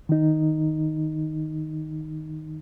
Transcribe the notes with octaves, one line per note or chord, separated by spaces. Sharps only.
D#3 D#4